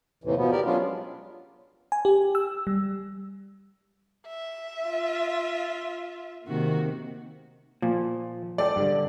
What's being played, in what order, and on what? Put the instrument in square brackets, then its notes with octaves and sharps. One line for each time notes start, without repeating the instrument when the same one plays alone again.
[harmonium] D#2 A2 C3 E3
B2 F3 B3
G4 A#4 D5
F#3 G#3 B3 C#4 D4 F4
[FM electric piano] G#5
G4
E6
G3
[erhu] E5
[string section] F4
[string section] C3 D#3 A#3 [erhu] F#4
[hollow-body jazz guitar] A#2 [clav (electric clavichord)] F3
[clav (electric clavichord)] G#3 A4 G5 [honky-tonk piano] D5
[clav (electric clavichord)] G2 D3